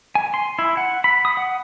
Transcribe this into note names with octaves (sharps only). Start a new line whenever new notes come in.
G#5
C6
E4
F#5
B5
D#6
F#5